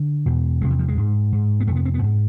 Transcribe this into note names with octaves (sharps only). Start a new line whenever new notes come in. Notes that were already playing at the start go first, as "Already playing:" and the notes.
Already playing: D3
E2 B2
E2 C3 G#3
E3
F3
G#3
G#2
G#2
B3
F2 C3 A3 B3
C4
B3
G#2